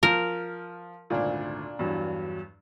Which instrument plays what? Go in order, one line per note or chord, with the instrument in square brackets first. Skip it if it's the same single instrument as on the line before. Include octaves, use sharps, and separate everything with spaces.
[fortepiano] F3 [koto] A#4
[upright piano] G#1 D2 D5 [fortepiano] A#2 D4
[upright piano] E2 G2 F#3